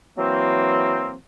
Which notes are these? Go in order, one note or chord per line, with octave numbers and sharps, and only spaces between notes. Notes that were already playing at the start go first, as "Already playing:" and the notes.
E3 F#3 A#3 C4